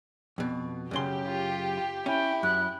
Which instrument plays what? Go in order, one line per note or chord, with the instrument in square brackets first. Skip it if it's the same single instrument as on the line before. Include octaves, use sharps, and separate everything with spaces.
[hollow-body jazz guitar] F2 B2
[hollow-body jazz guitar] F#2 C#3 C6 [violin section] G4
[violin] F4
[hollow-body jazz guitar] C#4 [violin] E4 [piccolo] G5
[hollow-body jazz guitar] F#2 [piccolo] F#6